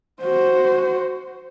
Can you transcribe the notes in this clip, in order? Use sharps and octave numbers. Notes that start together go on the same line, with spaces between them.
F#4 C5